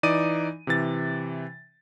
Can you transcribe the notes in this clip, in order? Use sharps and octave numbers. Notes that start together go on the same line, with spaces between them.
E3 D#4 D5 D#6 D#7
C3 E3 A6